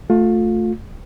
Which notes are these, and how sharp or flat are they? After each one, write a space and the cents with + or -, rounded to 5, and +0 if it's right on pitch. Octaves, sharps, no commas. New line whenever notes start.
A3 +0 F4 +25